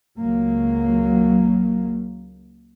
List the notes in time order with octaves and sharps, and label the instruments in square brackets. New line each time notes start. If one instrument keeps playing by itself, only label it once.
[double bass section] C#2 F#3 A#3